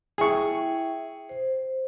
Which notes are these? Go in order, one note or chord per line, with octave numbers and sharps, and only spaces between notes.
E4 G#4 E5 G5 C#6
C5